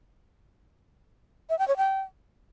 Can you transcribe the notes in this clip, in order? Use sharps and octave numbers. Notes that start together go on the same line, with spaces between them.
E5
G5
C#5
G5